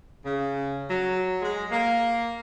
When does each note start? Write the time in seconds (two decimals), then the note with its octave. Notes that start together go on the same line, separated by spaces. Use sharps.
0.25 C#3
0.90 F#3
1.42 G#3
1.71 A#3